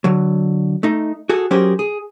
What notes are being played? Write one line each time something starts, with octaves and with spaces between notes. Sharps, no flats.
D3 F#3
A3 D#4
F#4 G#4 A4
F#3 C#4 G4 G#4 A#4 C5
G#4